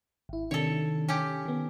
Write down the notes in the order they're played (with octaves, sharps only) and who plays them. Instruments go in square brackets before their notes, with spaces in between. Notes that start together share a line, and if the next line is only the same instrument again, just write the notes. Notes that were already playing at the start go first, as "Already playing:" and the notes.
[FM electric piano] G#1 E4
[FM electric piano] C3 D#3 D4 [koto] A4 C#5
[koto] C#4 G4
[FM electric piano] D#3 B3